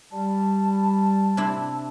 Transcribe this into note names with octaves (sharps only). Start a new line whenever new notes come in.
G3 A5
C3 D4 E4